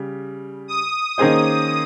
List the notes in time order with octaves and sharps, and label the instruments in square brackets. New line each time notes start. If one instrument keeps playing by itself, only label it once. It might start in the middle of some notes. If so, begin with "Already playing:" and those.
Already playing: [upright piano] C#3 G3
[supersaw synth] D#6
[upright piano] D#3 A#3 C#4 G#4 C5